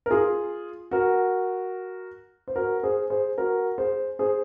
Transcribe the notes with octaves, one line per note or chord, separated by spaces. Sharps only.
A#4
F4 G#4
F#4 A#4
C5
F#4 A#4
G#4 C5
G#4 C5
F#4 A#4
G#4 C5
G#4 C5